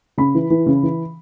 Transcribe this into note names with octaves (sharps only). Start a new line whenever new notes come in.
C#3 B5
E3
E3
C#3
E3